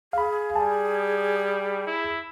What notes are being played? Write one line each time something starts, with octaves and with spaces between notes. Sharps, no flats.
G#4 F5 B5
G3 G#5 A5
E4